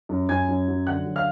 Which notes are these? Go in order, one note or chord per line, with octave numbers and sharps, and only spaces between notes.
F#2
F#2 G#5 G#6
F#2
F#3
D3 F#5 F#6
F#3
F5 F6